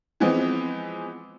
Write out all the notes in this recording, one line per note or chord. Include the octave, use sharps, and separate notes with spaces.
E3 F3 G#3 B3 C4